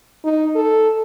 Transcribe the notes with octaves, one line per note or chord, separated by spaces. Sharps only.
D#4
A4